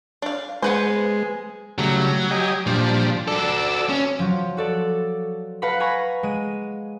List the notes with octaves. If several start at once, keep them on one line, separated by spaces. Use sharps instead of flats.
D4 F5
G#3 B3 B4 C5
C#3 F#3 G3 A3
G4 D#5 G#5
A#2 F3 G3 D4
F#4 A4 D5 E6
C#4
F3 F#3
F#4 A4 D5
B4 F5 F#5 A#5 B5
G#5 A#5 B5 C#6 A#6
G#3 D#7